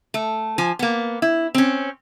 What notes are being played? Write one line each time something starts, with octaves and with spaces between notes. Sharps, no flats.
A3
F3 G#5
A#3 B3
E4
C4 C#4